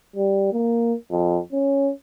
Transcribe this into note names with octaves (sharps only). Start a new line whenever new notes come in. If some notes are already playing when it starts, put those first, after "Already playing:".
G3
A#3
F2
C#4